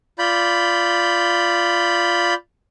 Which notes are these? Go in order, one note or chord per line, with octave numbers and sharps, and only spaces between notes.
F4 D5 B5 G6